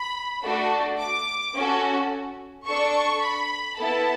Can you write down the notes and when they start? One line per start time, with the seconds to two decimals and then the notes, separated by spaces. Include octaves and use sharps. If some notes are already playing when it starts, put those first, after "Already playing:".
Already playing: B5
0.43 A3 D4 F#4 A4
0.99 D6
1.55 C#4 F#4 A4
2.67 D4 A4 C#6
3.22 B5
3.78 B3 E4 A4 A5